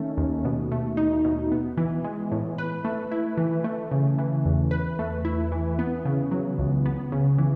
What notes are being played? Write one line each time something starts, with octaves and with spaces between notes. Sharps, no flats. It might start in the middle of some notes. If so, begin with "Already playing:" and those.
Already playing: D#3 A3 C#4
D#2
B2
A3
D#4
B2
B3
E3
G#3
A2
B4
A3
E4
E3
A3
C#3
E3
E2
B4
A3
E4
E3
B3
C#3
F#3
C#2
B3
C#3
E3